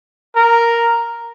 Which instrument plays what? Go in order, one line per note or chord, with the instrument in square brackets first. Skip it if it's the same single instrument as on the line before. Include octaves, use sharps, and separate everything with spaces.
[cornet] A#4